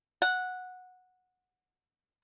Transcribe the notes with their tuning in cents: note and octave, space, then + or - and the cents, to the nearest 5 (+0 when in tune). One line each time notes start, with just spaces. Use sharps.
F#5 -10